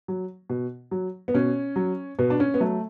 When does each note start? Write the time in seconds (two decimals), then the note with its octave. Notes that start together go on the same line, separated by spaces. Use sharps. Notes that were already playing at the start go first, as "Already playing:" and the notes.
0.08 F#3
0.50 B2
0.91 F#3
1.28 B3
1.34 B2 C#4
1.76 F#3
2.19 B2 B3
2.30 D4
2.40 C#4
2.54 B3
2.60 F#3 A3